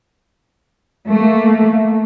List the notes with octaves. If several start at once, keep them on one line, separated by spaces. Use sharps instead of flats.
A3 A#3